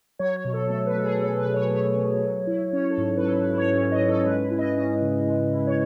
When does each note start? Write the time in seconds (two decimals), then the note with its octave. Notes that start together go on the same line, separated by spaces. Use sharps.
0.19 F#3 C#5
0.36 C#5
0.45 B2
0.54 A4
0.70 A3 A4
0.86 B4
0.96 B2 A4
1.04 G#4
1.21 F#3 A4
1.38 B4
1.47 B2
1.54 C#5
1.71 A3 C#5
1.97 B2
2.22 F#3
2.47 E4
2.73 C#4 C#5
2.90 A4
2.98 G#2
3.17 B4
3.23 F#3 A4
3.40 B4
3.49 E4
3.58 C#5
3.74 C#4
3.92 D#5
4.00 G#2
4.08 A4
4.25 G#3 B4
4.51 E4
4.59 D#5
4.75 C#4 D#5
5.01 C#3
5.26 G#3
5.52 E4
5.67 C#5